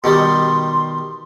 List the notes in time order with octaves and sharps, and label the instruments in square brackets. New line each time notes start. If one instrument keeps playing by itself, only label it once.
[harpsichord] B2 D#3 G3 [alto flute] C6